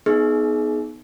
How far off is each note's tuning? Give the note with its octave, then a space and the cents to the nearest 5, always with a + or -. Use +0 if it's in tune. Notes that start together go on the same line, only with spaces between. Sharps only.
B3 +0 D#4 +0 G#4 +30